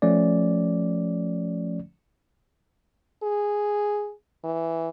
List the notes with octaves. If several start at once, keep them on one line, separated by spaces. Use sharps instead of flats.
F3 A3 C#4 D5
G#4
E3